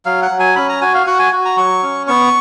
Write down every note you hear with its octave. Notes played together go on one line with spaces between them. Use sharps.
F#3 F5
F#5
F#3
G#5
C#4 B5
A#5
F#4 G#5
F5
F#4 F#5
G#5
F#4
A#5
F#3 C#6
C#4
B3 C#6